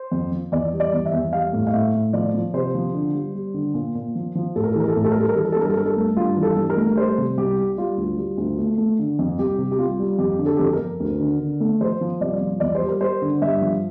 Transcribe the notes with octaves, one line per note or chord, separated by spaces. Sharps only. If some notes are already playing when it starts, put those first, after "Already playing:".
Already playing: C5
F2
F3
E2 D5
G3
D5
E2
E5
E2
G3 F5
A2
F5
A2 E5
A2
F3 D5
F3
C3 C5
F3
D3
G3
G3
D3
A#2
A#2
F3
F3
A2 A4
A#4
A4
E3
A#4
A4
A2 A#4
A4
A#4
G3 A4
A#4
E3 A4
A#4
A4
G2 A#4
A4
G2 A#4
A4
A3
G2 F4
E3
A4
G2
A#4
A3
G3 C5
C3
C2 G4
G3
G3 F4
D2
G3
D2
A3
A3
D3
F2
C2 G4
C3
G4
C2 F4
G3
F2 G4
D3
A4
F2 G4
A4
A#4
F2
D2
D3
D3
A3
F3 C5
F3
C2 D5
F3
E2 D5
C5
G3
A#4
G3 C5
D3
G2 E5
F3